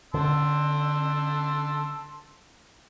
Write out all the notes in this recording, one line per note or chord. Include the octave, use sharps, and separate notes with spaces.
D3 A5 C6 E6